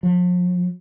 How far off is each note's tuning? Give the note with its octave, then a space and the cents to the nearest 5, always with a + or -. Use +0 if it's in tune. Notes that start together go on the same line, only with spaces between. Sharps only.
F3 +40